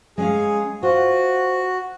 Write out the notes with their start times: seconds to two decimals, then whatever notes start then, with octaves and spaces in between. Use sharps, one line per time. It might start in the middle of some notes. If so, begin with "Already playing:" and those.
0.18 G#3 C#4 G#4 F5
0.83 F4 F#4 C5